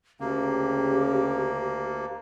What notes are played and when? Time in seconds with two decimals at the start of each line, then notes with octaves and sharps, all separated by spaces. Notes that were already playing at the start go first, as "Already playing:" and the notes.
0.20 D2 C#3 A#3 G4